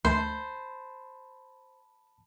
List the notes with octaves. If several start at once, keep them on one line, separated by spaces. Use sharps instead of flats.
D2 A3 C5 A5 B5